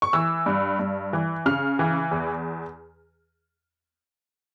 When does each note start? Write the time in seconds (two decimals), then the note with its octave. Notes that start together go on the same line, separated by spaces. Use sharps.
0.02 C#6
0.13 E3 E6
0.46 G2
0.79 G2
1.13 E3
1.46 C#3 F6
1.79 E3
2.11 E2